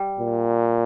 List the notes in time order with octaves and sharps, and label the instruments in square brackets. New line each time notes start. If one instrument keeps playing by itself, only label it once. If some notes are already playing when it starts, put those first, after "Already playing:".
Already playing: [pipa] G3
[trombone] A#2